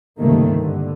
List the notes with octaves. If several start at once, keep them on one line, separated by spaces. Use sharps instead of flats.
C#2 G2 C3 D#3 A3 A#3
G2 D3